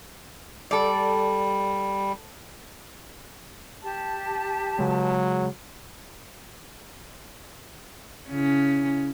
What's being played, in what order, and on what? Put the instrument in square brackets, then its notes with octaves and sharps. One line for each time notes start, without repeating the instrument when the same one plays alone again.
[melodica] G3 [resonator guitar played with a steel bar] A4 D5
[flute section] G4 A5
[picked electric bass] C#3 G#3 [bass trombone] F#3
[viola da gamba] C#3 C#4 E4